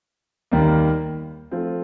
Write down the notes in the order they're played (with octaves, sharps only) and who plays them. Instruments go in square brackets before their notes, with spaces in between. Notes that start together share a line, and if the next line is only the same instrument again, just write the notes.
[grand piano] D#2 D#3 G3 A#3
F3 A3 C4 F4